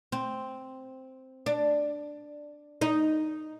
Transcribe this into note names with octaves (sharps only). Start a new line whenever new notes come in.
C4
D4
D#4